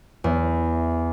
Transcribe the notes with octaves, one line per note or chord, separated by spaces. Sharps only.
E2